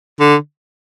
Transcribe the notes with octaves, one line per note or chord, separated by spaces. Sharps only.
D3